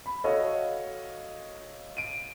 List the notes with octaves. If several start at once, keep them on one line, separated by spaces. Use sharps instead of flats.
B5
F#4 A4 C#5 D#5 F5
D7 D#7